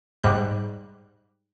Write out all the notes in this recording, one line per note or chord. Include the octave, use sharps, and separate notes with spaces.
G#2 G3 F#6